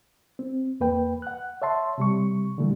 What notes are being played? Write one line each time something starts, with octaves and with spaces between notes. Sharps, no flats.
C4
E2 A#3 B4 G5
F#5 F#6
C#5 E5 A5 C6
C3 G3 C#6
A#2 D3 E3 G3 A3